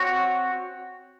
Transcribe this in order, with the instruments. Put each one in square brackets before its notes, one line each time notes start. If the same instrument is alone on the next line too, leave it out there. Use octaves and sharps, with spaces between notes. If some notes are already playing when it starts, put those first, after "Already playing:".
Already playing: [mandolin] C4 F#4 C#5